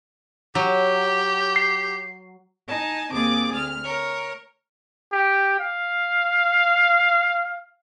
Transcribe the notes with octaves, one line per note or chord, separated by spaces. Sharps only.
F#3 G4
C7
D#4 G#5 A5
D#2 C4 G#4 D6 A6
D2 F6
A#4 C#5
G4
F5